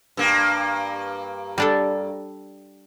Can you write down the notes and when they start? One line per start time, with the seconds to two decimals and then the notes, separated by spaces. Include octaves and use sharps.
0.17 G2 A#3
1.58 G3 D4 A4